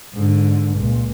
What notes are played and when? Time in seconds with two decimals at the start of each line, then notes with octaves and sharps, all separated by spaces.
0.13 G#2 D3
0.75 C#2 A#2